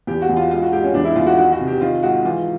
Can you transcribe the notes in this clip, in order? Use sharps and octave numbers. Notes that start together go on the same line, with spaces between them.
E2 G4
F#4
E2
F4
G#2 F4
F#4
G#2 G4
C#4
E2 D4
E4
E2 F4
F#4
D#3 F#4
F#4
C3
G4
D#3 F4
G#2 F#4
E3 F4